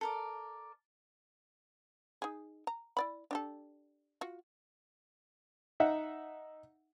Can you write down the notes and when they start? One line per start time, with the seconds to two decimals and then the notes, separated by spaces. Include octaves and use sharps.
0.01 A4 A#4 D5
2.22 D#4 G#4
2.67 A#5
2.97 E4 D5 B5
3.31 D4 G4 A4
4.21 F4 F#4
5.80 D#4 E5 F#5